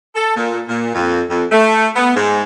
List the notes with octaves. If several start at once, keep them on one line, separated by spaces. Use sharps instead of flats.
A4
A#2
A#2
F2
F2
A3
B3
G#2